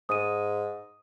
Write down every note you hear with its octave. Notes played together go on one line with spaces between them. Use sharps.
G#2 D#6 D#7